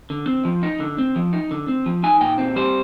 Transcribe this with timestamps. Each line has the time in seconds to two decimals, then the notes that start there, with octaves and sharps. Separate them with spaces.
0.10 D3
0.27 C4
0.45 F3
0.63 D#4
0.80 D3
0.98 C4
1.16 F3
1.33 D#4
1.51 D3
1.68 C4
1.86 F3
2.03 D#4 G#5
2.21 A#2 G5
2.38 C4
2.56 G3 C5